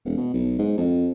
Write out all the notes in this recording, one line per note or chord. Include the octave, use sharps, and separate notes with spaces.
E1
B2
B1
G#2
F2